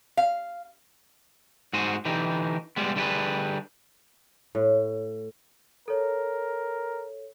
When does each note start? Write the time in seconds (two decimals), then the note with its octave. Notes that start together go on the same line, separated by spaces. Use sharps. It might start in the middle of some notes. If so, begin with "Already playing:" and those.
0.17 F5
1.73 G#2 F#4 G#4 C5
2.05 D3 E3 D#4 G4
2.76 G3 G#3 B3
2.96 D3 G3 E4 G#4 B4
4.55 A2
5.88 A4 A#4 C#5